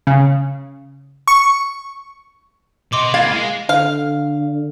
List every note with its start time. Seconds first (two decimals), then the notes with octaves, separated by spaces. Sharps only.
0.07 C#3
1.28 C#6
2.93 B2 D#5 C6 D6
3.14 E3 A#3 F5 G#6 A6
3.33 G#3
3.69 D3 F5